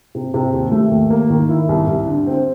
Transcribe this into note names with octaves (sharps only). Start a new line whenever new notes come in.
C3
C3
D#2
A3
D#2
A#3
D#3
E4
C2
C2
D3
C4